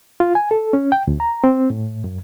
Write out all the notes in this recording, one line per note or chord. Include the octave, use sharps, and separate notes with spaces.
F4
G#5
A4
C#4
G5
D2
A#5
C4
A2
F#2